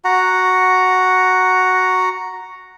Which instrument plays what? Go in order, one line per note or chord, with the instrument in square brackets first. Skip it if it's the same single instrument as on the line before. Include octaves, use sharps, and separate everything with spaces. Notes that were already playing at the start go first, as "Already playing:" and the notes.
[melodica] F#4 F#5 A#5